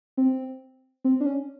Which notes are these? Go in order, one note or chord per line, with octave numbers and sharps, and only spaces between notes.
C4
C4
D4
C#4